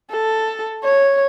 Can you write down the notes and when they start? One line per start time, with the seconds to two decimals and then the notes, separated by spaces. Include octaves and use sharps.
0.11 A4
0.84 C#5